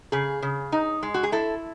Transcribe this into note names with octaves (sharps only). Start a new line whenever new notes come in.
C#3 G#4
C#3
D#4
G#3
F#4
G#4
E4 A4